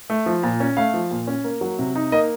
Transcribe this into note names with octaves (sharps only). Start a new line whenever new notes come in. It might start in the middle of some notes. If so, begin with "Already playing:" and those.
A3
F3
A#2
C#4
A3 F5
F3
A#2
C#4
A#3
F#3
C3
D#4
A#3 D#5